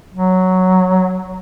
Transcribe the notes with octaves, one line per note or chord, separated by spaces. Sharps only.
F#3